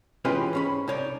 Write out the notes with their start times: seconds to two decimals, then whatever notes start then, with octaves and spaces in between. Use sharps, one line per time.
0.25 E3 G#3 C#4 F4 G4 B4
0.53 G#2 C#4 B5
0.88 C2 D#4 C#5 D5